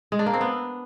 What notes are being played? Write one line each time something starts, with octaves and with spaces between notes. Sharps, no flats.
G#3
D4
A#3
C4
B3